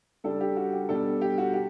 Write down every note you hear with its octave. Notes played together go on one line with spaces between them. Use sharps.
C#3 G3 D4 A4
G4
F#4
G4
B2 G3 D4 A4
G4
F#4
G4